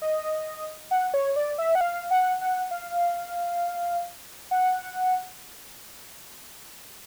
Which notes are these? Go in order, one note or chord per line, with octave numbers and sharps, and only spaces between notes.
D#5
F#5
C#5
D5
E5
F#5
F5
F#5
F#5
F5
F#5